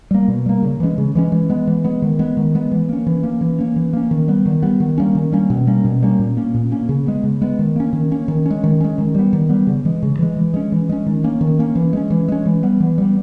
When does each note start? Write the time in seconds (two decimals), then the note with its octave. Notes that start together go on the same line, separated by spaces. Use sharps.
0.11 G3 A#3
0.28 B2
0.46 G3 A#3
0.62 C#3
0.80 E3 G#3 C#4
0.98 C#3
1.15 E3 G#3 C#4
1.32 E3
1.50 G#3 B3
1.67 E3
1.84 G#3 B3
2.02 D#3
2.19 G#3 B3
2.37 D#3
2.55 G#3 B3
2.72 E3
2.89 A#3 C#4
3.07 E3
3.23 A#3 C#4
3.41 E3
3.59 A#3 C#4
3.76 E3
3.93 A#3 C#4
4.11 D#3
4.28 G3 B3
4.46 D#3
4.63 G3 B3
4.80 D#3
4.98 G3 A#3 C#4
5.15 D#3
5.32 G3 A#3 C#4
5.50 B2
5.67 G3 A#3 C#4
5.85 B2
6.02 G3 A#3 C#4
6.19 A#2
6.37 A#3 C#4
6.54 A#2
6.71 A#3 C#4
6.89 C#3
7.07 G#3 B3
7.24 C#3
7.42 G#3 B3
7.59 D#3
7.76 A#3 C#4
7.93 D#3
8.11 A#3 C#4
8.28 D#3
8.46 G#3 C#4
8.64 D#3
8.81 G#3 C#4
8.98 D#3
9.15 G3 B3
9.33 D#3
9.50 G3 B3
9.67 C#3
9.85 E3 G#3
10.03 C#3
10.19 E3 G#3
10.37 E3
10.54 G#3 C#4
10.72 E3
10.89 G#3 C#4
11.06 D#3
11.24 A#3 C#4
11.41 D#3
11.59 A#3 C#4
11.76 E3
11.93 G#3 C#4
12.10 E3
12.28 G#3 C#4
12.46 E3
12.63 G3 B3
12.80 E3
12.98 G3 B3